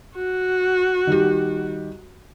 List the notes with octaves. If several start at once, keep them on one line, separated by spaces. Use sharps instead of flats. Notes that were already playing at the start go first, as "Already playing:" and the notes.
F#4
D#3 G3 G4